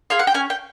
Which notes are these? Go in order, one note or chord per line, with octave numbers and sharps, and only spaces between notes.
F4 G#4 F5
F#5
G5
C#4 G#5
G5